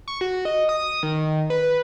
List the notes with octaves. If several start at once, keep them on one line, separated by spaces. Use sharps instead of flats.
C#6
F#4
D#5
D#6
D#3
B4